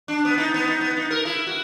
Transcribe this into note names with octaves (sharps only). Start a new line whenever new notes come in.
D4
B3
D#4
B3
D#4
B3
D#4
A#4
E4
F#4